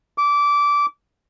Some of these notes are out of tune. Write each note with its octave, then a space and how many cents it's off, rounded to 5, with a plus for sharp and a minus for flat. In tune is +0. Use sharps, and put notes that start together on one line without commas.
D6 -20